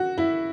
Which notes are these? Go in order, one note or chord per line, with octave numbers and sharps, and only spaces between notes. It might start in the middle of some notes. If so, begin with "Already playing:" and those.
Already playing: F#4
E4